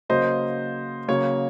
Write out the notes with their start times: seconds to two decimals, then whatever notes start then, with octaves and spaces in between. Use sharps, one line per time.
0.09 C#3 F#3 A#3 C5 D#5
1.08 C#3 F#3 A#3 C#5